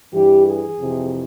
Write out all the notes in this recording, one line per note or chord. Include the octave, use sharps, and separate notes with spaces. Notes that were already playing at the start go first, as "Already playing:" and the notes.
G2 E3 G4
G#4
F2 C3 E3